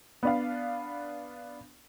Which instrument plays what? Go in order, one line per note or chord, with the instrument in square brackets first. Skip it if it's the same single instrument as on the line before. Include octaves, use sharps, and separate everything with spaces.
[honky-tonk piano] B3 D4 F5